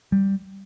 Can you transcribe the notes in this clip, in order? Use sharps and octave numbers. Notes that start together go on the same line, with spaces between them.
G3